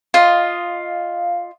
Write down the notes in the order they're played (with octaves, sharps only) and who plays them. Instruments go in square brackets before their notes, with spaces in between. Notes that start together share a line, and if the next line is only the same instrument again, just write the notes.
[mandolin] F4 D#5